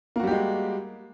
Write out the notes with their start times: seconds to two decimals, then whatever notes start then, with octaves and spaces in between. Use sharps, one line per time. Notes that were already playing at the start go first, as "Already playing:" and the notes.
0.16 A#3
0.19 F#4
0.23 G3
0.27 G4
0.31 G#3